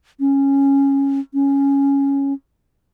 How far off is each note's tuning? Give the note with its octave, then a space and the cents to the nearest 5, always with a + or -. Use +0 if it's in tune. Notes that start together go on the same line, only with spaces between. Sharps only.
C#4 -10
C#4 +0